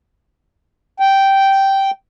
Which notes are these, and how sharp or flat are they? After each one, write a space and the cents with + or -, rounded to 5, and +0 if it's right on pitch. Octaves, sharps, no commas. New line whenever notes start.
G5 -10